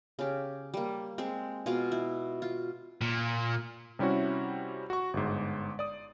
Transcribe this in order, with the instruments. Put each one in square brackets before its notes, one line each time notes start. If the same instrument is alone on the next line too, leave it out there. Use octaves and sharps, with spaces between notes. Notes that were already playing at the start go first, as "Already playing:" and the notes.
[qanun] C#3 G4
G3 A#3
G#3 C4
B2 F4 G#4 F5
E4
F4
[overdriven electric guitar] A#2
[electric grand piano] C3 G3 C#4 E4 F#4
F#4 C#6
G1 G#2
D5 D#6